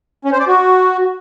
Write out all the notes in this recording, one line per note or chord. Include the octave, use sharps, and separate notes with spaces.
C#4
C5
D5
F#4